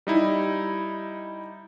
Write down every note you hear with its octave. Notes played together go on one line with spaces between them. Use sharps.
G3 D#4 E4